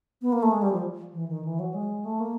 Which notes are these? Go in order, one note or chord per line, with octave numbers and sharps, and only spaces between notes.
B3
A#3
A3
G#3
G3
F3
E3
D#3
E3
F#3
G#3
A3
A#3